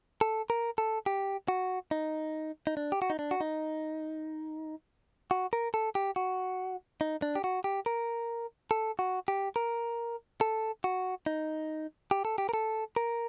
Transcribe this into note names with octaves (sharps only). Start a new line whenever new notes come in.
A4
A#4
A4
G4
F#4
D#4
D#4
D4
G4
F#4
D#4
D4
F#4
D#4
F#4
A#4
A4
G4
F#4
D#4
D4
G4
F#4
G4
A#4
A4
F#4
G4
A#4
A4
F#4
D#4
G4
A4
G4
A#4
A4
A#4